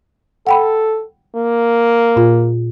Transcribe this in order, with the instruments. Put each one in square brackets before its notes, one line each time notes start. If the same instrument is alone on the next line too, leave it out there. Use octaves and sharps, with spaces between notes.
[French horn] A4 [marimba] F#5 G5 B5
[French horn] A#3
[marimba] A#2 F4